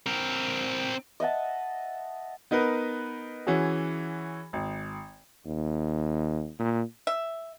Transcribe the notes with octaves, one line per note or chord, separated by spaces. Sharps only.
C4 A#4
D#5 E5 F#5 A5
B3 D#4 A#4 B4
E3 C#4 F#4 G#4
G#1
D#2
A#2
E5